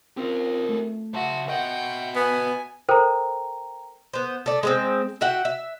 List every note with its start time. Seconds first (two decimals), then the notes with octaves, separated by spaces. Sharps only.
0.17 C4 C#4 F4 G4 A#4
0.69 A3
1.14 C#3 F#4 E5 A5 C6
1.49 F#4 D#5 F#5 G5
2.15 B3 G#5
2.89 A4 A#4 C5 G5 A#5
4.14 B3 C5
4.46 A3 D5
4.63 G#3 B3 C4
5.21 F#4 E5 F#5 G5
5.45 E5